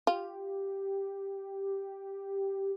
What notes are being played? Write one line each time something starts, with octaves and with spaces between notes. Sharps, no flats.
F4 G4